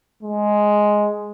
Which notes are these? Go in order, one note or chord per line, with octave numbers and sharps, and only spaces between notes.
G#3